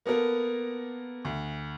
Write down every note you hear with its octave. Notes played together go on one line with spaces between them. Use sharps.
A#3 B3 A4 A#4
D2